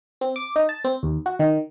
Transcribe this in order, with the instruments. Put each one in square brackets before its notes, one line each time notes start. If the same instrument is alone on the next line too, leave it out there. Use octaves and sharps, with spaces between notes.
[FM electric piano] C4
D6
D#4
A5
C4
D#2
F#4
D#3